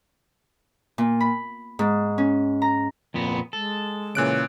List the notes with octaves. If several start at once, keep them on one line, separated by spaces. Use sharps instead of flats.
A#2
B5
G#2
C#4
A#5
F2 A#2 B3
G#3 A4
A#2 C#3 E3 C#4 F#6 D7